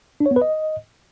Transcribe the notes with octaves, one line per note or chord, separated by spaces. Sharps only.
D4
C#5
B3
B4
D#5